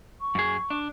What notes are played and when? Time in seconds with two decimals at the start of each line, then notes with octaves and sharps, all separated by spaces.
0.21 C#6
0.35 F#2 G#4
0.70 D4